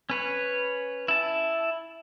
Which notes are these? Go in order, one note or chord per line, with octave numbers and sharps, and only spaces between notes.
C#4 B4 C#5
E4 A5